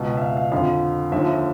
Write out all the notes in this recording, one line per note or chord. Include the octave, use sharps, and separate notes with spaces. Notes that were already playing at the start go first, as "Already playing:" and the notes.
Already playing: C#2 B2
E5
F5
F5
F2 D3 F3 F5
D#2 D3 F3 E5